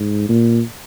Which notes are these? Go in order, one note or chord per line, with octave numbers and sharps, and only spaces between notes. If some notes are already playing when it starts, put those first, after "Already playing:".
Already playing: G#2
A#2